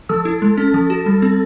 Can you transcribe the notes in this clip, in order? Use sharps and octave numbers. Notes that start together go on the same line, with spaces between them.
F3 A4
E4
G#3
C#4
F3
F#4
G3
C4